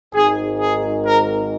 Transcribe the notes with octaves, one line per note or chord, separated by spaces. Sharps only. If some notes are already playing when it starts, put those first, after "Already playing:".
G#1 G#2 D#3 G#4
G#4
A#4